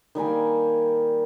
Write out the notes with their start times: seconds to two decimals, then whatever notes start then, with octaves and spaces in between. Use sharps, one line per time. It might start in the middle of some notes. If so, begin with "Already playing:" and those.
0.15 D#3 G3 A#3 G#5